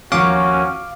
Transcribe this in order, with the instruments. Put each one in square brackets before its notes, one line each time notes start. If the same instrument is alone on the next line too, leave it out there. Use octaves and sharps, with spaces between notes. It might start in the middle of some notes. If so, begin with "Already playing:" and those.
[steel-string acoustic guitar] D#2 F3 A#3 [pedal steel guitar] C#4 [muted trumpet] F#4 [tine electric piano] F5 D6